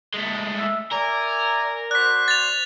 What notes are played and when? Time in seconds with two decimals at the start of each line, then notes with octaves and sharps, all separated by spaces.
0.14 G#3 A3
0.57 E5
0.91 A#4 D5 E5 G#5
1.91 F#4 C5 D5 F#6 B6
2.28 A6 F7